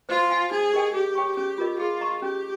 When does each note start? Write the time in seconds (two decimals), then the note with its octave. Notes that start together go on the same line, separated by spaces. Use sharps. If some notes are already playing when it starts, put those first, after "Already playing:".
0.09 F4 C5
0.30 F5 G#5
0.51 D#4 G#4
0.73 G4 A#4 D#5 G5
0.94 G4 G#4
1.15 C#5 G5 C#6
1.36 C#4 G4
1.58 F4 A#4 D#5
1.79 F4 G#4
2.01 D#5 A#5 C#6
2.22 C#4 G4